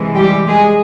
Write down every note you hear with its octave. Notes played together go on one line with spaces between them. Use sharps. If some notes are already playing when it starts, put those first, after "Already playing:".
Already playing: C3 E3 G#3
G3 G4
G#3 G#4